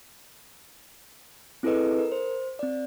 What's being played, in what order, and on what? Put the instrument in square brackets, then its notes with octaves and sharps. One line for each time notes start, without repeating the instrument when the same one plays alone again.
[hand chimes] C4 E4 G#4 A4 B4 D#5
A#4
C5
C4 D5